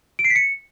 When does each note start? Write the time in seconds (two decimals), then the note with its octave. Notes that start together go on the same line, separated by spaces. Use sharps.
0.19 D7
0.24 C7
0.30 B6
0.36 C#7